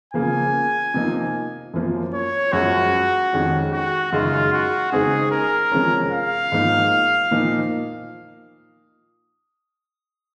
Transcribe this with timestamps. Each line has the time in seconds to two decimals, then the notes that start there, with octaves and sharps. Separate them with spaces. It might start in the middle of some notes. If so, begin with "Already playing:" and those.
0.14 C#3 F3 A#3 G#5
0.94 C3 F3 A#3 D#4
1.74 F#2 F3 A#3
2.13 C#5
2.53 F#2 F3 G#3 F#4
3.33 F2 D#3 G#3 C#4
3.72 F#4
4.12 F#2 C#3 G#3 D#4 F4
4.52 F#4
4.92 C#3 G#3 C4 D#4 G#4
5.32 A#4
5.72 C3 F3 G#3 C#4
6.11 F5
6.52 G#2 F3 A#3 D#4
7.31 A#2 F3 A#3 D#4